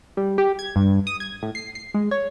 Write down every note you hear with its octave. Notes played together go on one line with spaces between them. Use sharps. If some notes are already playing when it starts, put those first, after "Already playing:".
G3
G4
G#6
G2
D#6
G#6
A2
C7
C7
G#3
C#5